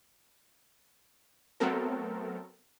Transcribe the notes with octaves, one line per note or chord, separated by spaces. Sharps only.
F#3 A3 B3 C4 A4 A#4